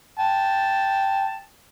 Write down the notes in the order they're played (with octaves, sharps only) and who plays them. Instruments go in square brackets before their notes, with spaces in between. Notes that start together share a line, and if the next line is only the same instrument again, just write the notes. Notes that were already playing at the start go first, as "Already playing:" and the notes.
[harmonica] G5 A5